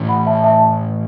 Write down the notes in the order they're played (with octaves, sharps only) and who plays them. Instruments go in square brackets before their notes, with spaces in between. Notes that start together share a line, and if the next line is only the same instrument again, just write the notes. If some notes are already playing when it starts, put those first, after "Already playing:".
Already playing: [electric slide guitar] A2 E3 C#4
[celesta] F#5 B5
E5 A5
E5 A5